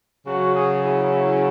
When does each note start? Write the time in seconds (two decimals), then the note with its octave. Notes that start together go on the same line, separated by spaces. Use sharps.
0.24 C#3 F#3 F#4
0.53 G#4
0.80 E4
1.09 E4